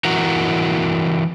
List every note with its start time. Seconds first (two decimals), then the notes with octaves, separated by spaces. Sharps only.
0.05 E3 E4 F#4 A#4 F#5 A#5